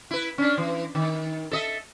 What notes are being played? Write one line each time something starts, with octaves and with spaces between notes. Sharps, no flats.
E4 B4
C#4 D4
E3
D#3
A4 D#5 E5